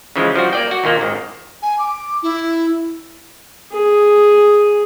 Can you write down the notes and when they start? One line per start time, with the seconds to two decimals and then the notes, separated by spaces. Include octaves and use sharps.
0.16 C#3 E3 F3 G#3
0.35 F3 G3 F#4
0.53 A#3 D5 G5
0.71 F#4
0.84 D#2 A#2 A#3
1.01 G#1 D#3
1.62 G#5
1.79 D6
2.23 E4
3.72 G#4